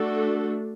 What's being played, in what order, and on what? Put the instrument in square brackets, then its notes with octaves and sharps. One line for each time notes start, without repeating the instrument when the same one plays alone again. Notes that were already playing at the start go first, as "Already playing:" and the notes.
Already playing: [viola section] A3 D4 F#4 A4